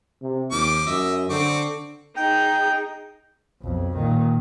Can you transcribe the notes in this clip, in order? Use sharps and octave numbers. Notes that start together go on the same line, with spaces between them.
C3
D#2 F3 D6
F#2 D#5 E5
D3 C4 C#6 D6
D#4 G#4 G5
B1 F2
A#2 D#3